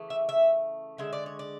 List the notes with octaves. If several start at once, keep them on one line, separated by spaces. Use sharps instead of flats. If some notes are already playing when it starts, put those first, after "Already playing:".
Already playing: C#3 E3 A3
E5
E5
D3 G#3 E5
D5
C#5
D5